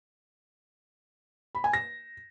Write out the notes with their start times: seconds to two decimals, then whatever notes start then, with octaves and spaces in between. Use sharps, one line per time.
1.55 B5
1.64 G#5
1.73 A#6